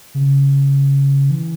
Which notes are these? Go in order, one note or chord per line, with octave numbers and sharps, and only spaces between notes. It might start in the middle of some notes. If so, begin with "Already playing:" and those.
C#3
E3